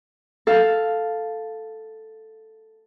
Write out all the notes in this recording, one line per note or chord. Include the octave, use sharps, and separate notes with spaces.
A4 F5